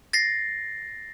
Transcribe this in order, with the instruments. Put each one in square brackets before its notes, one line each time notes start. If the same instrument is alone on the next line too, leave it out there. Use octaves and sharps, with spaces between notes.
[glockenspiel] A6 A#6 C7